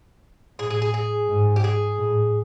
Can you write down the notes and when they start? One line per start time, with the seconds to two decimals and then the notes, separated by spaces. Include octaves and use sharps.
0.59 A2 G#4
0.70 G#4
0.82 G#4
0.94 G#4
1.28 G#2
1.56 G4
1.64 G#4
1.99 A2